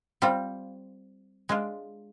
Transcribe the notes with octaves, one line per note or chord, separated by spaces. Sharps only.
G3 C4 F4
G#3 D4 F4